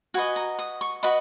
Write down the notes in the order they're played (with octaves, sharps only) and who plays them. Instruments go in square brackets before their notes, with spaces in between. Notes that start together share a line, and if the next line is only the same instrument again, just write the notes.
[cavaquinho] F#4 B4 D#5 G#5
A#5
D#6
C#6
F#4 B4 D#5 B5